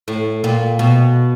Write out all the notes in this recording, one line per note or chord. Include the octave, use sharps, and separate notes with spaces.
A2
A#2
B2